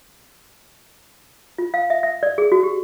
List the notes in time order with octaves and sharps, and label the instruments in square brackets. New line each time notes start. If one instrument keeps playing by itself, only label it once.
[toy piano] F4
F5
E5
E5
D5
G#4
F#4
G4